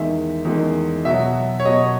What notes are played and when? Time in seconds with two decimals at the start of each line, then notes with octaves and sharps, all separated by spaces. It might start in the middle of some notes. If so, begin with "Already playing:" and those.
Already playing: E2 D#3 G#3 E5
0.45 E2 D#3 G#3
1.05 B2 F#3 E5
1.60 C#5
1.66 B2 F#3 D#5